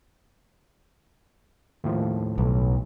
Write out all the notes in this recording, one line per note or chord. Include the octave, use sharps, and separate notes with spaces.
D#2 A2 F3
B1